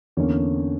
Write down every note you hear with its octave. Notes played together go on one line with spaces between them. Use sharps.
E2 D3 A#3 C#4 C#5